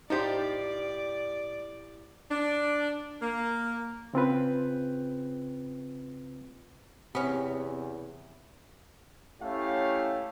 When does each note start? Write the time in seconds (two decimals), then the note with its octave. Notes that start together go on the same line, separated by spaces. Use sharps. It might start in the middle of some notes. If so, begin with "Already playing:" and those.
0.10 A2 D#4 F4 G4 C5 D5
2.31 D4
3.22 A#3
4.13 C#3 C4 F4 B4
7.15 E2 C3 B3 C#4
9.41 A3 C#4 E4 G4 C#5 F5